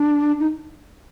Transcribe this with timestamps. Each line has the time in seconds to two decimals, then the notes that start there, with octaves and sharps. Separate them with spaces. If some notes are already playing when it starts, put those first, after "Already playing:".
Already playing: D4
0.40 D#4